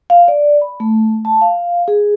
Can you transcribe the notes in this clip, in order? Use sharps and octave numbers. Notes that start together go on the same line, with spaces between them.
F5
D5
B5
A3
A5
F5
G#4